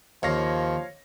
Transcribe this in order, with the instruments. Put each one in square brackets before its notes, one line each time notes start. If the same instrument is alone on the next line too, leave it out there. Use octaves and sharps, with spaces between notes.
[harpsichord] D#2 [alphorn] F3 [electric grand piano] C#5 F5 A#6